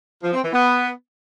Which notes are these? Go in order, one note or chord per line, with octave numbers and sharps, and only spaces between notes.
F3
C4
E3
B3